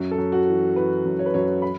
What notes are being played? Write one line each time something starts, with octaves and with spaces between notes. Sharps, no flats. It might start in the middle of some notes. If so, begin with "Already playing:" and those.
Already playing: F#2
A4
F#2
F#4
E3
E3 B4
F#2
C#5
B4
F#2 C#5
B5